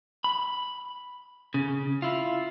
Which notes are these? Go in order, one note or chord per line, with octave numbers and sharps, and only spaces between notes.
B5
C#3
E4 F4